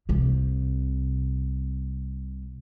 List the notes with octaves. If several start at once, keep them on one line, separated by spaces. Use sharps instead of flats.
C2 C3